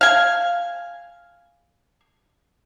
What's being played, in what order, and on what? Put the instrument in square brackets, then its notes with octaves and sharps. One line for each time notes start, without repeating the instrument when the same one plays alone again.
[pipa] F5 G#5